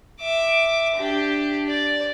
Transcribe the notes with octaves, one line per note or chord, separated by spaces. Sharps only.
E5 D6
D4 G4
D5